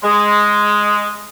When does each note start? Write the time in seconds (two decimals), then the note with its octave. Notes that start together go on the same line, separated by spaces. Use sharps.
0.04 G#3